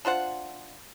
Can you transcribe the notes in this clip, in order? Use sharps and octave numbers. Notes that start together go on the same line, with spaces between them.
D4 F4 C5 F#5